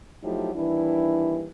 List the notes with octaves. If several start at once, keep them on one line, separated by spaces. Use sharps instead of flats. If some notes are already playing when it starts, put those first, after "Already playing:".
F3 F#3 A3 D#4 E4 G4
D#2 E3 G3 D4 E4